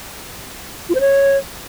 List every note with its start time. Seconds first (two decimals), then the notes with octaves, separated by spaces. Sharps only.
0.89 F4
0.95 C5
1.01 C#5